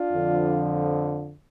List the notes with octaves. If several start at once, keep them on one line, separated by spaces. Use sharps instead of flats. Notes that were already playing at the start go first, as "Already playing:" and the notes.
Already playing: D4 F4
F2 D3 F3